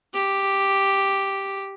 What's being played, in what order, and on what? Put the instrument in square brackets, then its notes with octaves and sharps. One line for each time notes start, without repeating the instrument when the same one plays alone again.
[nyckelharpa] G4